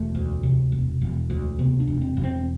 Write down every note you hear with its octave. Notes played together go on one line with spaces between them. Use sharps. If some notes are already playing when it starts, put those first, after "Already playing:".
Already playing: E1 A3
D2
C3
E1
E1
D2
C3 B3
D4
E1
C4
E1
C4